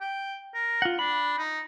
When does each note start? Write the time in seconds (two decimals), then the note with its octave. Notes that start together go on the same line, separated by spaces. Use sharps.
0.01 G5
0.54 A#4
0.82 F4 F#5
0.99 D4 B5
1.38 D#4